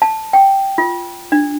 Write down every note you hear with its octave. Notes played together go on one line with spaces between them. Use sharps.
A5
G5
F4
D4